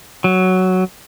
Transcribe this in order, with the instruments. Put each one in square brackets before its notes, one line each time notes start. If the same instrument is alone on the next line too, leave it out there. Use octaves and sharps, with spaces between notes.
[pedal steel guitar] F#3